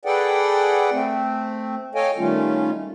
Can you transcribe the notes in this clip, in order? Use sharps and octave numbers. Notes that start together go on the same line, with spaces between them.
G#4 A4 B4 D5 F#5 G5
A3 C4
A4 C#5 D#5 F5 G5 G#5
D#3 G3 A3 C#4 F4